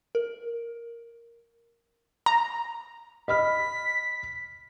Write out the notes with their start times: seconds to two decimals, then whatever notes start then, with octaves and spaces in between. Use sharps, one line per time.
0.15 A#4
2.26 A#5
3.28 D#5 B5 F6 B6